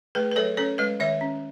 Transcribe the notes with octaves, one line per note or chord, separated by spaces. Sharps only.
A3 G#4 B4
B4
F#3 A4 C#5
C#4 A4 C#5
G#3 B4 D#5
D#3 C#5 E5
C#4